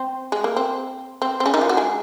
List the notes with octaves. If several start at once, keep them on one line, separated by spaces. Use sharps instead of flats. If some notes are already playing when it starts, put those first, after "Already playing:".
Already playing: C4
G#3
A#3
C4
C4
C4
C#3 C#4
D#3 D#4
F3 F4
F#3 F#4
G#3 G#4